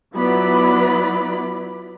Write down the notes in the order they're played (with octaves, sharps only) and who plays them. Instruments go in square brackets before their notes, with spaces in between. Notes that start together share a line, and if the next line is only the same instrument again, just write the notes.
[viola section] F#3 B3 E4 F4 D5 B5